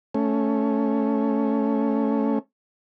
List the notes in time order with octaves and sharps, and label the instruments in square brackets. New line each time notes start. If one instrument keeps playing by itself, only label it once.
[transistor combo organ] A3 C#4